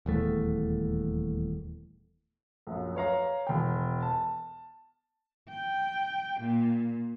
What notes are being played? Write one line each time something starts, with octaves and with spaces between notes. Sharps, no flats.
D#1 E2 A3
A#1 F#2
B4 C#5 F5 A#5
E1 G5
A5
G5
A#2